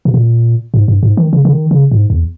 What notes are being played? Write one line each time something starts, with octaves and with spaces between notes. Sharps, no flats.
B2
A#2
G#2
G2
G#2
D#3
C#3
C#3
D#3
C#3
G#2
E2